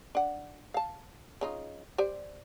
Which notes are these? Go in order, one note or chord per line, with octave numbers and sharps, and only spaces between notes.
D4 F#5
F5 A5
C#3 D#4 F4
G4 C5 D5